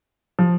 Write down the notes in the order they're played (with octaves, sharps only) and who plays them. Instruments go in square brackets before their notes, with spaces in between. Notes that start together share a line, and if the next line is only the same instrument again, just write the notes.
[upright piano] F3